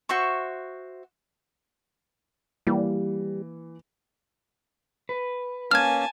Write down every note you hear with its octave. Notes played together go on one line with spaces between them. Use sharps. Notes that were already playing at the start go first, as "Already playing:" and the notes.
F#4 C5 E5 C#6
E3 G3 A#3
B4
A#3 C#4 G#5 A5 F6 G#6